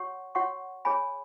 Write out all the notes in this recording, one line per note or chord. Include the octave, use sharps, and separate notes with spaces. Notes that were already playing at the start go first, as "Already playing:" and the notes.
Already playing: F#4 C#5 F#5 C#6
F#4 C#5 F#5 C#6
G#4 C#5 G#5 B5